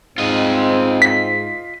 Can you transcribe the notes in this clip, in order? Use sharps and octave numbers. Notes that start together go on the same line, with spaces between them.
G#2 C4 F4 D#5
B6